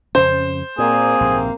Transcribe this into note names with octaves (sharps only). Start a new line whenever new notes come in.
F2 C#3 C#4 C5
A#2 A#3 C4 G#4
A#1 G#2 C3